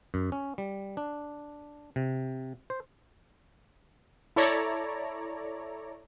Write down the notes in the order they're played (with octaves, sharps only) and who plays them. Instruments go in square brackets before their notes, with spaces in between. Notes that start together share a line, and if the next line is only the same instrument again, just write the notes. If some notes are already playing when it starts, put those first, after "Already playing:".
[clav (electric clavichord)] F#2
C#4
G3
D4
C3
C5
[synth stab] E4 A4 C#5 D5 A#5